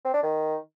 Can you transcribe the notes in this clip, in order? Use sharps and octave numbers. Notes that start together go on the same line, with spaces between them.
C4
D4
D#3